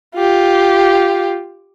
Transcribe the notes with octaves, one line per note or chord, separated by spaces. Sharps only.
F4 G4